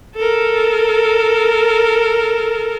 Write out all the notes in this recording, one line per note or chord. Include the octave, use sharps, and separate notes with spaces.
A4 A#4